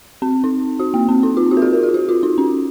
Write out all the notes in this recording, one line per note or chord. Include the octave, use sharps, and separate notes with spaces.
C4
D#4
F#4
A#3
C4
D#4
F4
F#4
A#4
G#4
A#4
G#4
F#4
F4
D#4
C#4